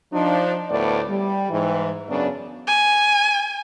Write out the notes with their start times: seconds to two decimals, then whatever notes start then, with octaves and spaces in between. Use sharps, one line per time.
0.13 F3 D4 D#4
0.70 D2 A2 B3 D5
1.08 G3
1.50 G#2 E3
2.09 F#2 C#3 F#3 B3 D4
2.67 G#5